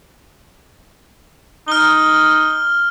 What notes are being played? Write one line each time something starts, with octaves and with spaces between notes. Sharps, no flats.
D#4 F6 G7